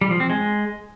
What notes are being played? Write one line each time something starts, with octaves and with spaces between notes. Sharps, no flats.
G3
F3
C4
G#3